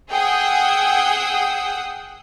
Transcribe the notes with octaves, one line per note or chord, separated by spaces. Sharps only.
G#4 F#5 G5 D#6 E6